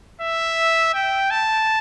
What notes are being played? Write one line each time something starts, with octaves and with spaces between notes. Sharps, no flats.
E5
G5
A5